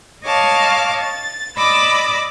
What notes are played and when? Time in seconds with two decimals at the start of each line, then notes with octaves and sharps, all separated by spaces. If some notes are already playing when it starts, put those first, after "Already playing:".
0.25 C#5 D#5 F5 A5 D6
1.01 A6
1.57 D5 D#5 B5 D6 E6